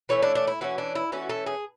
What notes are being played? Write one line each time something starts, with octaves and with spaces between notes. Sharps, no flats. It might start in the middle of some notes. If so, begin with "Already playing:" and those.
E3 A3 C#4 C#5
D4
D4
E4
E3 A3 C#4 F#4
D4
E4
E3 A3 C#4 F#4
A4
G#4